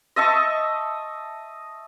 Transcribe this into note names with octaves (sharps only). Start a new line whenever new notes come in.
D#5 E5 A5 C#6